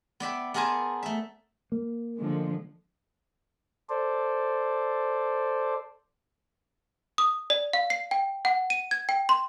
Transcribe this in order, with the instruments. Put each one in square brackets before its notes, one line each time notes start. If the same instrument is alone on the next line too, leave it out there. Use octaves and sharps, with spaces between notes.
[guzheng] B3 D5 E5 G5
B3 G#4 A#4 C5 G#5 A5
A3 E5
[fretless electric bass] A#3
[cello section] D3 F3 G#3
[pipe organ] A4 C5 D5
[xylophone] D#6
D5
F5
C7
G5
F#5
D#7
G#6
G5
C6